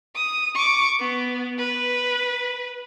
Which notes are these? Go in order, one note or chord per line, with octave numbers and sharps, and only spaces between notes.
D#6
C#6 D6
B3
B4